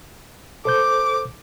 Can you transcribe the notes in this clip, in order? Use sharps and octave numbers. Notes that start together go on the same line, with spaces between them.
A4 C5 D6 G6